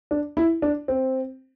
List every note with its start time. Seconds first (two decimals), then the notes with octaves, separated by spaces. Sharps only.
0.11 D4
0.37 E4
0.62 D4
0.88 C4